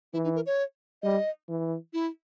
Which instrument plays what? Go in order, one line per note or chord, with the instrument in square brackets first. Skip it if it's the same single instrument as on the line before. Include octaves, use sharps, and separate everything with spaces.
[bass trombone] E3 [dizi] E4
[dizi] D#4
A#4
C#5
[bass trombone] G3 [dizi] D#5
[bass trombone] E3
[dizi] E4